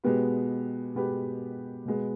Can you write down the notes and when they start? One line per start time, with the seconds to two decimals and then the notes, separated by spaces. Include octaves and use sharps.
0.04 B2 G#3 B3 G4 B4
0.95 B2 G#3 B3 G4 B4
1.86 B2 G#3 B3